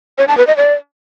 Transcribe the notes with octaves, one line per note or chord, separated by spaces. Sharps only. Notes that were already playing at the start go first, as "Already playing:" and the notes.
C#5
A5
B4
D#5
D5